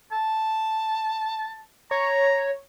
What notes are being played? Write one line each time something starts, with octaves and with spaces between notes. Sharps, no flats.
A5
C#5 A#5